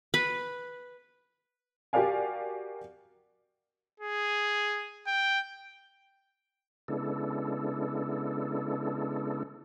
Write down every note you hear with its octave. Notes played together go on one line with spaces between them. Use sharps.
B4
F#4 G4 A#4 D5 F5 G#5
G#4
G5
C#3 G#3 B3 D4 E4 A4